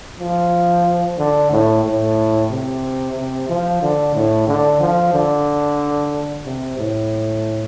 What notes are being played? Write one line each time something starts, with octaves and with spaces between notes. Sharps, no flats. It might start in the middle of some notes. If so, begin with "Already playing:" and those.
F3
D3
A2
A2
C3
C3
F3
D3
A2
D3
F3
D3
C3
A2